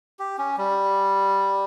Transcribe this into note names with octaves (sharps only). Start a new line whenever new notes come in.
G4
C#4
G3